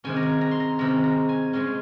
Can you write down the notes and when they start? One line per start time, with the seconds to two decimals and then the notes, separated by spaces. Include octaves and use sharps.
0.04 C3 D#3 G#3 C#4 G#5
0.17 A#5
0.23 G#5
0.41 A#5
0.51 C6
0.60 A#5
0.79 C3 D#3 G#3 C#4 A#5
1.04 A#5
1.29 G#5
1.53 A#2 G#3 C#4 G#5